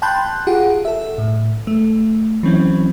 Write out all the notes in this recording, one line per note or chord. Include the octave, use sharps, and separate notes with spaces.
G5 A5 B5 C6 F#6 G6
F4 G4 G#4 F#5
A4 E5
A2
A3
E3 F#3 C4 C#4